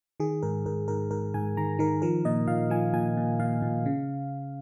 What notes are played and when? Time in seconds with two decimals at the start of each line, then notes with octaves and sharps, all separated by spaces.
0.20 D#3 G#4
0.42 G#2 A#4
0.66 G#2 A#4
0.88 G#2 A#4
1.11 G#2 A#4
1.34 G#2 G#5
1.57 D#3 A#5
1.79 D#3 A#4
2.02 F3 A#4
2.25 A#2 D#5
2.47 A#2 F5
2.70 F3 G#5
2.94 A#2 G#5
3.17 A#2
3.39 A#2 F5
3.62 A#2
3.86 C#3